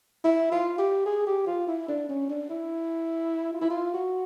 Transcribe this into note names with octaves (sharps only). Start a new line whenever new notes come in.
E4
F4
G4
G#4
G4
F4
E4
D4
C#4
D4
E4
F4
E4
F4
F#4